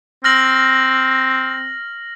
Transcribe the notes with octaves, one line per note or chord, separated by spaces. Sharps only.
C4 F6 A#6 F#7